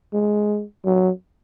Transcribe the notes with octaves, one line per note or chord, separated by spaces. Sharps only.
G#3
F#3